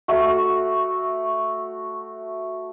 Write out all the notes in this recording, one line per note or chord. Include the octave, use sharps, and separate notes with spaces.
A3 F#4